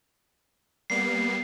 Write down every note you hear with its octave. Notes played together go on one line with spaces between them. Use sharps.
G3 A#3 B3 C7